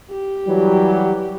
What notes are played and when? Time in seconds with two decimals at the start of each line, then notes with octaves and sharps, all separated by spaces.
0.11 G4
0.47 E3 F#3 G3